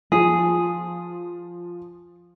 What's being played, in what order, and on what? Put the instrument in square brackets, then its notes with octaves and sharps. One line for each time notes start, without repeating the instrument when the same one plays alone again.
[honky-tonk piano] F3 [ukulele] G#4